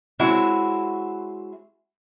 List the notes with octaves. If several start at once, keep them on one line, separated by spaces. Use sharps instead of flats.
G#3 C4 E4 F#4 C#5